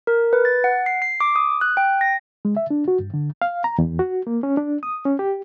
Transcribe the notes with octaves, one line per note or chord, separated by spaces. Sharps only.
A#4
B4
A6
F#5
C7
C7
D6
D#6
F#6
G5
A#6
G#3
E5
D4
F#4
G2
D3
F5
A#5
E2
F#4
A#3
C#4
D4
D#6
C#4
G4